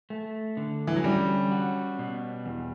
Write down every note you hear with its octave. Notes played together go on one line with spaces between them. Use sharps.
A3
D3
E3
F#3
G3 C#4
F#4
B2
E2